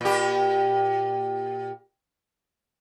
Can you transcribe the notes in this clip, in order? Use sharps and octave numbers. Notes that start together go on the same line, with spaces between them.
A#2 G4